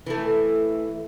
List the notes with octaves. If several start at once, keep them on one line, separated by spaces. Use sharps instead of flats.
E3 A3